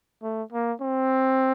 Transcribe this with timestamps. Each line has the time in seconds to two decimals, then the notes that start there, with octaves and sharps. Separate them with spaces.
0.23 A3
0.52 A#3
0.81 C4